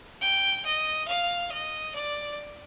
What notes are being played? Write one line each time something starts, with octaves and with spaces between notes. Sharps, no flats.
G5
D#5
F5
D#5
D5